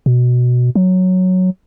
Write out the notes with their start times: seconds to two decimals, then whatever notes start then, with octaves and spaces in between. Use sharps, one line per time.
0.06 B2
0.75 F#3